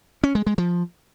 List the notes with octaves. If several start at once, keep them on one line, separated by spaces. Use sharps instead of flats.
C#4
G#3
G#3
F3